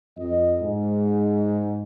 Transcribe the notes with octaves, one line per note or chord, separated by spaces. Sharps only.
F2 D#5
G#2